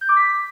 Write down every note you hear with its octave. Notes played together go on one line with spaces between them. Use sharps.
G6
D6
B6